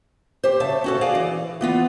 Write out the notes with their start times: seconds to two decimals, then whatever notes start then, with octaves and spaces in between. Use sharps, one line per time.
0.44 G4 C5
0.60 C#3 C#5 E5 A5
0.84 C#4 F#4 A4
1.01 G#4 D5 F5
1.15 E3
1.61 E3 B3 F4